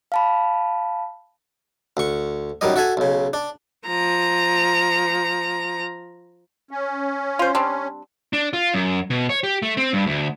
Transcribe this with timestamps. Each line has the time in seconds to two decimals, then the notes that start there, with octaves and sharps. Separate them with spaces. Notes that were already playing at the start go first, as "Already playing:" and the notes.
0.12 F5 A5 B5
1.97 D2 C#6
2.61 F#2 D#3 G3 D#5
2.76 F#4 A4 E5 G#5
2.97 B1 C#3
3.33 D4
3.87 F3 A#5
6.71 C#4
7.39 F4 C5
7.55 G3 C4 D4
8.33 D4
8.53 F4
8.74 F#2
9.10 B2
9.29 C#5
9.43 G4
9.62 A3
9.77 C4
9.93 G2
10.06 D2